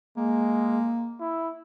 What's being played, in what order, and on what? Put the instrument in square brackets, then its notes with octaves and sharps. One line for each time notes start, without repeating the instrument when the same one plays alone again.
[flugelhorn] G#3 [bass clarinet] A#3
[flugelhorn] E4